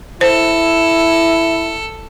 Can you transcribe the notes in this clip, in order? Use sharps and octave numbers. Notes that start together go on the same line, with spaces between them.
E4 A4 C5